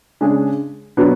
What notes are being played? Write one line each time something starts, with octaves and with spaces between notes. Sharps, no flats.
C#3 G#3 D4 G#4
B2 F#3 B3 D4